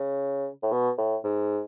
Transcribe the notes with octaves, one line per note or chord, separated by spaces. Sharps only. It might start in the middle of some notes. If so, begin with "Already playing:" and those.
Already playing: C#3
A2
B2
A2
G#2